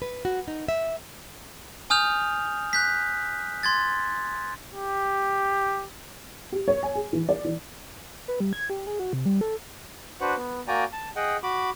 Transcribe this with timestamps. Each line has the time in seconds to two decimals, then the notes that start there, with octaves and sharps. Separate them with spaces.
0.02 B4
0.25 F#4
0.48 D#4
0.68 E5
1.90 G#5 D#6 F6 G6 F7
2.73 F#6 G6 B6
3.63 C6 G#6 A6
4.74 G4
6.52 G4
6.68 C#5
6.83 G#5
6.95 G#4
7.13 E3
7.29 D5
7.44 E3
8.28 B4
8.40 G3
8.53 G#6
8.70 G4
8.87 G#4
9.00 F#4
9.13 C3
9.26 G3
9.41 A4
10.21 D4 F#4 B4 C5 F#5
10.37 B3
10.68 A#3 F#4 D5 G5 G#5 A#5
10.93 A5
11.16 G#4 D#5 F#5 G5
11.43 F#4 B5 D6